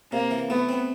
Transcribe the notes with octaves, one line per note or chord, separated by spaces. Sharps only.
C3 A#3
E3
A3 B3
C4